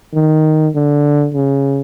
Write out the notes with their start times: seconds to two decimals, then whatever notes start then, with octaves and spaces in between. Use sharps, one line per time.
0.14 D#3
0.75 D3
1.35 C#3